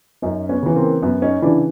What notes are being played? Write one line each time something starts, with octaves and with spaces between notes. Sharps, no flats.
F#2 C#4 D#4
B3 C#4
C#3 E3
A#3 C4
F#2 B3
C#4 D#4
C#3 E3 D4 E4